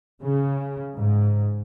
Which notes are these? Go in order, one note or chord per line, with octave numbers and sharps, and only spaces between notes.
C#3
G#2